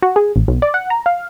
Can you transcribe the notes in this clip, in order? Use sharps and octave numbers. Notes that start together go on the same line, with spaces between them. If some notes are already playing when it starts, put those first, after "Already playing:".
F#4
G#4
A1
B1
D5
F#5
A#5
F5